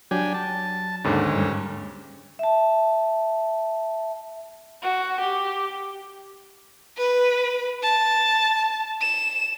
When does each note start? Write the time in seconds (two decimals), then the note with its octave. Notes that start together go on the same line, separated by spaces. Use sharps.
0.11 F#3 D4 G4 G#5
0.34 A5
1.04 D#2 G#2 D3 C#4
1.36 G2
2.39 E5 A5
4.81 F#4
5.19 G4
6.97 B4
7.83 A5
9.01 E7